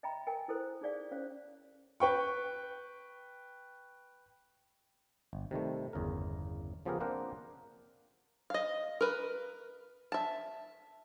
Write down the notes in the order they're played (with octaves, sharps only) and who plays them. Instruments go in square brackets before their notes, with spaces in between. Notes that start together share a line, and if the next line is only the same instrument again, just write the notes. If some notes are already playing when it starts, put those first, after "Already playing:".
[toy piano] D#5 E5 G5 A#5 B5
A#4 D#5 G5 G#5 A#5
E4 A4 A#4 C5
D#4 G#4 D5 F5
C#4 C5 C#5 F5
[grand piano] B4 G5 C#6
[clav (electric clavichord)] G1
C3 D#3 G3 A3
G1 E2 C#3 A#4
C#3 F3 B3 G4 G#4 A#4
A#3 C4 D4 A#4 C5 F#5
[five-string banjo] D#5 F5
A#4 B4
E5 A5